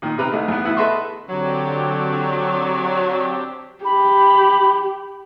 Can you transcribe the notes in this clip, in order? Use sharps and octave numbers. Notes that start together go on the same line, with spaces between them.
A#2 D#3
C3 B4 A#5 F6
C2 A3 D#4
E2 B3
D2 B3 E4 F#5 E6
A4 B4 D#5 E5 C6 C#6
D3 F#3 C4 D4 G4
G4 B5